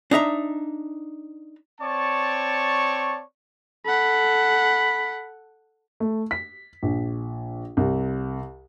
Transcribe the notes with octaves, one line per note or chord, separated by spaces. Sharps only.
D4 D#4 E5 A#5
C4 C#5 D5 A5 C#6
A4 F#5 B5
A3
B6
A#1
C2